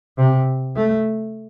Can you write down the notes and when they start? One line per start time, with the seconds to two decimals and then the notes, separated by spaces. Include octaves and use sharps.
0.18 C3
0.76 A3